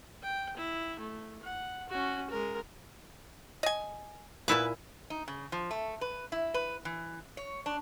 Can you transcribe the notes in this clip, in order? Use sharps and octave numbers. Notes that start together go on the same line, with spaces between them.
G5
E4
A3
F#5
C#4 F#4
G#3 A#4
D#5 G#5
A#2 B3 E4 B4 G#5
D#4
C#3
F3
A3
B4
E4
B4
E3
C#5
D4